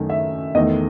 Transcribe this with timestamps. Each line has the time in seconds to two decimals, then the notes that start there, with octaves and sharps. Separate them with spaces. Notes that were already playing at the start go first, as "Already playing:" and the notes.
Already playing: F#2 D#3 A3
0.10 E5
0.55 E2 D#3 A3 D#5